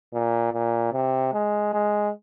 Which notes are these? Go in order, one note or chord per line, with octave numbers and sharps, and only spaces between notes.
A#2
A#2
C3
G#3
G#3